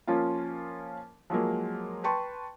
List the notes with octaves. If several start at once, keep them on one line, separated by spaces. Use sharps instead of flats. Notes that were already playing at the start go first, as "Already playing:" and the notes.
F3 A#3 C#4 F4
F3 F#3 G#3 A#3
B4 G5 A5 C6 C#6